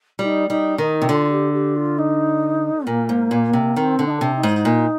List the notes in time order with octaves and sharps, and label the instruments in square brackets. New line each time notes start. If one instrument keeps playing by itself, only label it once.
[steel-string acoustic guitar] G3 [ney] F4
[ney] D#4
[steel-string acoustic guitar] G3 [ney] D#4
[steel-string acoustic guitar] D#3 [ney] D#4
[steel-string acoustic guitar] C3
[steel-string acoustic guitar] D3 [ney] F4
[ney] G4
G4
F4
D#4
[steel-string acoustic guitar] A#2 [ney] A#3
[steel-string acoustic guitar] G#2
A#2
C3
[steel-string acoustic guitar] D#3 [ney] C4
[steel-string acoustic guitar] D3
[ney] D#4
D4
[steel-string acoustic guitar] C3
[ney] D#4
[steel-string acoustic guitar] G#2
A#2